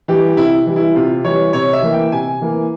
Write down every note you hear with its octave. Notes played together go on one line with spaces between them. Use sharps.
E3 G3 G4
C3 E4
E3 G3
E4
C3 F4
E3 G3 C#5
C3 C#5
E5
E3 A#3
G5
C3 G#5
E3 A#3